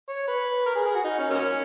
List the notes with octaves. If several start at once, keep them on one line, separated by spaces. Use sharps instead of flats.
C#5
B4
A#4
G#4
G#4
F#4
D#4
C#4
F#3 A#3 C#4